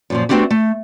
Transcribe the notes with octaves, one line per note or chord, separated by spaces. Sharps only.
F#2 A#2 F3
A3 B3 C4 D4 F#4 G4
A3